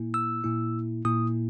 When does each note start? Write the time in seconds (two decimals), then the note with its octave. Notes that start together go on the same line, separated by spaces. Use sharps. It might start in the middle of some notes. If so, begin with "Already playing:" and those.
Already playing: A#2 A#3 E4
0.14 E6
0.44 A#2 A#3 E4
1.05 A#2 A#3 E4 D#6